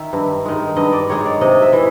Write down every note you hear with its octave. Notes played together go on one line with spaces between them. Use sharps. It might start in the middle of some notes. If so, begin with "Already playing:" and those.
Already playing: D#3 E5
G2
D#3 G#3
G2 D#5
D5
D#3 G#3 C#5
D5
C3 D#5
E5
E3